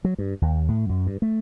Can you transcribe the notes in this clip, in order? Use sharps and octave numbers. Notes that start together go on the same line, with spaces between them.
F#3
G2
D#2
A2
F#2
G2
A3